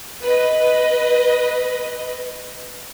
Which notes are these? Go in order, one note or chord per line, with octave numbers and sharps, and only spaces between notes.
B4 D#5